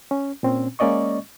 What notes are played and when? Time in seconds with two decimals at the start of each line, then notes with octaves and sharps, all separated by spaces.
0.11 C#4
0.43 A#2 C4 C#4
0.79 G#3 A#3 C#4 D5 D#5 C#6